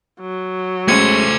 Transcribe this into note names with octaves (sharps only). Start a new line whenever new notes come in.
F#3
A2 G#3 A3 C#4 C5 C#6 G#6 C#7